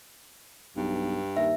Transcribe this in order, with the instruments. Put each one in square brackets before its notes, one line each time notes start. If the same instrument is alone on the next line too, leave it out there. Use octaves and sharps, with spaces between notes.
[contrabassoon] B1 [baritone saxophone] G2
[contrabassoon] D#2 [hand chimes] E5